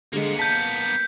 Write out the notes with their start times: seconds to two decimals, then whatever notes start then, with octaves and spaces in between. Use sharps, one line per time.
0.13 D3 G#3 A#3 B3
0.39 A5 G6 B6